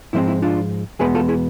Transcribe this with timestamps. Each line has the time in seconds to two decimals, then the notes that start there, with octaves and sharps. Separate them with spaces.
0.13 G#2 F3 G#3 C4 E4
0.27 E4
0.42 D4 F4
0.99 E2 B2 G#3 B3 G#4 B4
1.15 F4 A4
1.28 E4 G#4